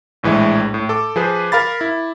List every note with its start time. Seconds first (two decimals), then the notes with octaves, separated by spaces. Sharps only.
0.23 A#1 A2 E3 G#3 E5
0.74 A2
0.89 A4 D6
1.16 F3 G#4 B4 C5
1.52 A#4 F5 B5 A6
1.81 E4